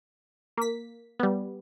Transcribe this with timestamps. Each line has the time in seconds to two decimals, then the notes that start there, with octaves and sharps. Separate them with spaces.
0.57 A#3 B6
1.19 G3 B3